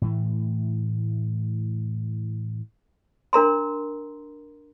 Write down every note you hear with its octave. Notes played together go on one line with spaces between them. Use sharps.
A2 E3 A3
D4 A#4 A#5 C6